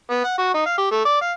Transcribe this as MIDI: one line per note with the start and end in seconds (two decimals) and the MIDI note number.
0.10 0.19 59
0.24 0.33 78
0.38 0.51 66
0.54 0.65 63
0.66 0.74 77
0.78 0.91 67
0.91 1.03 57
1.05 1.19 74
1.21 1.31 77